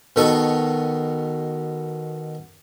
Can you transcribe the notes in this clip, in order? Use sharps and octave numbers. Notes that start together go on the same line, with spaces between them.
B2 D#3 A4 A5 C#6